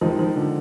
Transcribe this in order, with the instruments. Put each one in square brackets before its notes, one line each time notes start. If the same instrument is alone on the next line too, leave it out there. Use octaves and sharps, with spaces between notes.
[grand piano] D#3 G#3 D#4 [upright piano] F3
[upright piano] F3
D3